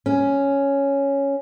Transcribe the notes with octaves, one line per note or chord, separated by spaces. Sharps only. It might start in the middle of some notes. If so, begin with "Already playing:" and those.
C#4